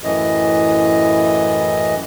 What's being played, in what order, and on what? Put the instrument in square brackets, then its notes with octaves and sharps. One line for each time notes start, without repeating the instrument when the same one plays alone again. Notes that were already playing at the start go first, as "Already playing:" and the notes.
[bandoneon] F#2 A2 E3 D#5